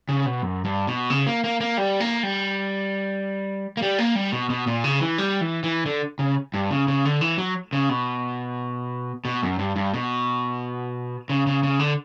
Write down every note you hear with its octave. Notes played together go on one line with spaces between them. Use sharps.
C#3
B2
F#2
G2
B2
C#3
A#3
A#3
A#3
G3
A#3
G3
A#3
G3
A#3
G3
B2
B2
A#2
C#3
E3
G3
E3
E3
D3
C#3
G2
C#3
C#3
D3
E3
F#3
C#3
B2
B2
F#2
G2
G2
B2
C#3
C#3
C#3
D3